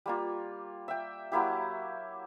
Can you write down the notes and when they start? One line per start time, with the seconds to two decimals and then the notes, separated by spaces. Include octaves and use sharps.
0.06 G3 A#3 F4
0.88 E5 G5
1.32 F#3 A#3 E4 G4